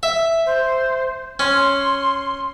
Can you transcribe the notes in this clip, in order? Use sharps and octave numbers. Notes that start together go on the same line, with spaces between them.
E5
C5
C#4 C6